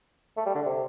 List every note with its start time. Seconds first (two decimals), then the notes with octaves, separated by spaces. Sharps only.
0.37 A3
0.46 G3
0.55 D3
0.66 C3